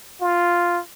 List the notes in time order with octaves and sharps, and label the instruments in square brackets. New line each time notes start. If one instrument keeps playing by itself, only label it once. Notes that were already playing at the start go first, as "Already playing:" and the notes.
[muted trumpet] F4